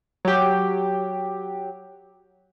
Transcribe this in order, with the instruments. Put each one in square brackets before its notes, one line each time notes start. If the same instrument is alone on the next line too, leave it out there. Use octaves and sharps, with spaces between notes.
[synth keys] F#3 G4